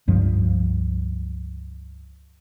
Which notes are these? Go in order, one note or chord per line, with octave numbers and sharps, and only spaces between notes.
C#2 G2 F3